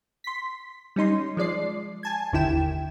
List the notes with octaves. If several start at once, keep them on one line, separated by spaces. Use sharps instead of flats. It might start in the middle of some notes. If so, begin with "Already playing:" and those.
C6 B6
G3 C#4 D#4 C6
F3 G#3 D5 C7
G#5 A5 G#6
G1 D#2 D3 E4 G5 E7